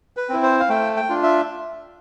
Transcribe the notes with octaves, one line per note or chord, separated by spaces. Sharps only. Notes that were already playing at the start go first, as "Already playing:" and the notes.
B4
C4 E4
C5
F5
A3 G5
G5
D4 F4
E5